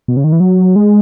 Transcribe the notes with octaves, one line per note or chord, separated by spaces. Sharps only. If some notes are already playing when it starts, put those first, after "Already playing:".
B2
C#3
D#3
E3
F#3
G#3